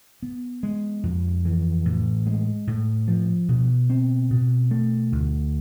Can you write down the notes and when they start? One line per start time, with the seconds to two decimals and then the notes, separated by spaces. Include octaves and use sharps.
0.23 B3
0.63 G#3
1.03 F2
1.45 E3
1.85 A2
2.26 G#3
2.67 A2
3.08 F3
3.48 B2
3.90 C4
4.31 B2
4.71 A3
5.12 D2